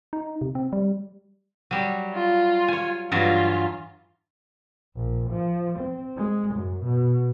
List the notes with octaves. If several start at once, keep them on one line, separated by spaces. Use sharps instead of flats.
D#4
C3
C4
G3
F#3 G3
F4
C#5 G#5
G2 E3 F#3 F4
A#1
F3
C4
G#3
F#2
B2